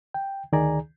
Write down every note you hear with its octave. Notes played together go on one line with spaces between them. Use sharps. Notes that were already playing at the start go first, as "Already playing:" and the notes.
G5
D2 D#3 G#4 D5 G#5 A#5